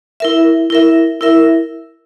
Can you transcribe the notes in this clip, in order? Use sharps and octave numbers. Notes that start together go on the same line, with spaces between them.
E4 A#4 E5
E4 A#4 E5
E4 A#4 E5